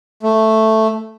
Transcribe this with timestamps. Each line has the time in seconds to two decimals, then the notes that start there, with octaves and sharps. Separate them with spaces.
0.23 A3